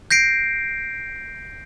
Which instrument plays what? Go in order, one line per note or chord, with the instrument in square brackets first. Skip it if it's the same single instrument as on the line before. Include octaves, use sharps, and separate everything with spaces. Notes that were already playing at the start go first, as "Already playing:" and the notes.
[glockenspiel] G6 A#6 C7 D7